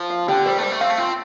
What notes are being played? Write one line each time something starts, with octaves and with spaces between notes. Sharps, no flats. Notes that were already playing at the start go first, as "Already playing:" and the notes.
Already playing: F3
F5
D3 G4
G3 C5
A3
G3 C5
A3
C4 F5
A3
C4 F4